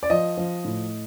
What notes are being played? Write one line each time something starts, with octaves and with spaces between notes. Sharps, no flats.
D5
F3 D#5
F3
A2